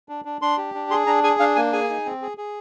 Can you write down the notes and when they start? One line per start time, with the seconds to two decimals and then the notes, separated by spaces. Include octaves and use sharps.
0.09 D4
0.25 D4
0.41 D4 C6
0.58 G4
0.75 D4
0.91 G#4 C6
1.07 D4 A#5
1.24 G#4 G#5
1.39 D4 F5
1.56 A#3 G#5
1.73 G#4 G#5
1.90 D#4
2.06 C4
2.22 G#4
2.38 G#4